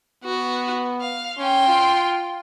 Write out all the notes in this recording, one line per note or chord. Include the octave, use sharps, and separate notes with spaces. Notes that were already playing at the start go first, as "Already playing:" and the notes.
B3 F#4
F5
C#4 G5 C6
F4